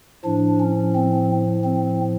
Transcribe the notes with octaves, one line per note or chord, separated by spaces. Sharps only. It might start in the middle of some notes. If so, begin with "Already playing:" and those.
A2 F3 D4
C#4
C4
C4